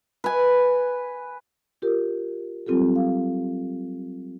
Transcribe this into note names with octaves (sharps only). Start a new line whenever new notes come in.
B4 G#5
F4 G4 A#4
F#3 G3 C4 F4 G4 A4
F5